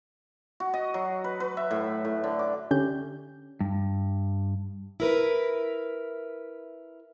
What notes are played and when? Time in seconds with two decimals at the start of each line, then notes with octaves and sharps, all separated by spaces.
0.60 F#4
0.74 D#5
0.94 F#3
1.24 B4
1.40 B4
1.57 E5
1.71 A2
2.05 A2
2.24 D3
2.39 D6
2.71 D3 C#4 G4 G6
3.61 G2
5.00 E4 A#4 B4